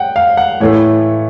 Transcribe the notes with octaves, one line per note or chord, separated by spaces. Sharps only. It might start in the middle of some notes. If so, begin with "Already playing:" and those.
Already playing: F#5 G5
F5
F#5
A2 E3 A3 C#5